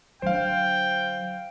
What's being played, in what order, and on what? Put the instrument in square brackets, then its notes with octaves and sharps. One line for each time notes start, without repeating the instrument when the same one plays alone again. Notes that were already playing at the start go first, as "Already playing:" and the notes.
[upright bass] D3 F#3 [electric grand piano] C5 F5 [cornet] G5